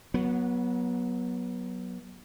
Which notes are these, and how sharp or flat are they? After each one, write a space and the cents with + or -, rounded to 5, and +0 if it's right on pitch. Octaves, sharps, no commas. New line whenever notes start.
F#3 +0 B3 -25